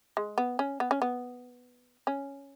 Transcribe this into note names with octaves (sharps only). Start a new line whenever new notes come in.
G#3
B3
C#4
B3
C#4
B3
C#4